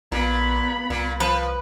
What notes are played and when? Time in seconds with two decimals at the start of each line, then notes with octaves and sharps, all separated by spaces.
0.12 A#1 A#2 B3 B5
0.90 C2 A#2
1.20 F3 B4